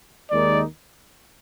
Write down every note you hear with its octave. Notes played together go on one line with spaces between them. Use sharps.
D#2 D#3 G#3 D#4 D5